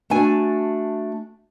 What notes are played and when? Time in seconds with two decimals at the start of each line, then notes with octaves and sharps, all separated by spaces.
0.10 A3 D4 F#4 G#5